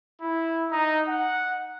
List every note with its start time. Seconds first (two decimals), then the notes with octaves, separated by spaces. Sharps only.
0.22 E4
0.72 D#4
1.08 F#5